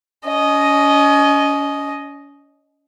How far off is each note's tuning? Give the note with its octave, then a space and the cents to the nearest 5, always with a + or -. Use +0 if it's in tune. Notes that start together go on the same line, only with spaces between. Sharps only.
C#4 +35 D#5 +0